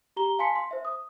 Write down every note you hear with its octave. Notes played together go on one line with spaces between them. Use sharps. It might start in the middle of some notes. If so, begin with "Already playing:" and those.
G4 A#5 G7
F5 G#5 A5 C6 B6 C#7
C6
C5 E5
D#6